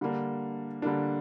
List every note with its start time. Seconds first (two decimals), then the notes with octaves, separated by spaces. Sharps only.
0.01 D3 G3 A#3 D4
0.82 D3 G3 A#3 D4